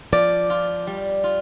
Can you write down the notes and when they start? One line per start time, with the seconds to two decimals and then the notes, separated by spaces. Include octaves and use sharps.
0.12 F3 D5
0.50 F4
0.87 G3
1.23 F4